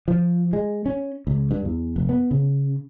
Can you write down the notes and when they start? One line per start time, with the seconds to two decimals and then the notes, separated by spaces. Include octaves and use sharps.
0.08 F3
0.53 G#3
0.86 C#4
1.27 C#2
1.51 G2
1.65 E2
1.96 F1
2.09 B3
2.31 C#3